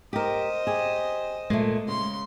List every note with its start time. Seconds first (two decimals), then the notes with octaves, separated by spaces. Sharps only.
0.13 G4 A#4 C5 D#5
0.67 G4 G#4
1.50 A#2 G#3 A3
1.88 C#3 C6